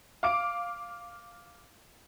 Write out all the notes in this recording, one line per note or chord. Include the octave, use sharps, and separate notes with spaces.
F5 D6 D7